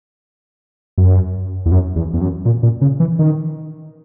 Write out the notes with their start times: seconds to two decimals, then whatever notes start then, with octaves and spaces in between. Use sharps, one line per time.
0.98 F#2
1.66 E2
1.72 F#2
1.96 E2
2.14 E2
2.21 F#2
2.45 A#2
2.63 A#2
2.82 C#3
3.00 E3
3.19 D#3